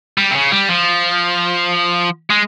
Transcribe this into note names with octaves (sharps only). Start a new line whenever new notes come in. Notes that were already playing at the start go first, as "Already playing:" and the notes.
G3
C3
C#3
G3
F3
G#3